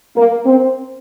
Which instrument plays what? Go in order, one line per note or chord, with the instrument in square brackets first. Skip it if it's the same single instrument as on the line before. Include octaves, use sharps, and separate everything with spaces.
[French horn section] A#3
C4